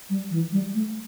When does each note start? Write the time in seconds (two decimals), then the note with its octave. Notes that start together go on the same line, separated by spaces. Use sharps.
0.10 G3
0.31 E3
0.52 G3
0.74 A3